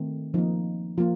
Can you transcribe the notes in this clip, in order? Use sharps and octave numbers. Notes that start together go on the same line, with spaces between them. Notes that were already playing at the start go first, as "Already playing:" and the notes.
Already playing: D#3 A3 C4
F3 A#3 D#4
F3 A#3 F4